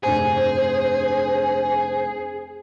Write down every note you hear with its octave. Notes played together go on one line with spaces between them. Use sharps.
F1 G2 G#4 C5 G#5